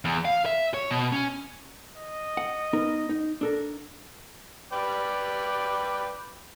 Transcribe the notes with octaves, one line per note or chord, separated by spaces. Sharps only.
E2
F5
E5
C#5
B2
C#4
D#5
F#5
B3 D#4 A#4
D#4
D4 A4 A#4
B4 D5 G5